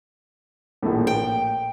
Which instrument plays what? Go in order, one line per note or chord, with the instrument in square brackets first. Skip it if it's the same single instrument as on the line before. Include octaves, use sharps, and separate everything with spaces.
[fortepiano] A#1 A2
[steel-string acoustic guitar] G5